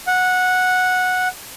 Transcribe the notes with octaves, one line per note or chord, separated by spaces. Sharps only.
F#5